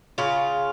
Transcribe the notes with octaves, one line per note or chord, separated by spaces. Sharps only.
C#3 F4